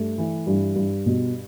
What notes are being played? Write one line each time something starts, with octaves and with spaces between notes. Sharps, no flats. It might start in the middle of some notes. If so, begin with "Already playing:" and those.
Already playing: G2 A3
E3
G2
G2
B2